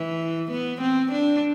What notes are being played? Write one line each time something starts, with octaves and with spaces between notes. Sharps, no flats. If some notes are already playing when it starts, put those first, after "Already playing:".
Already playing: E3
B3
C4
D4